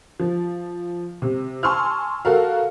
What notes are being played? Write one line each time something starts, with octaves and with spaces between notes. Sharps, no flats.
F3
C3
G#5 A5 C6 C#6 E6 F6
F#4 A4 A#4 F5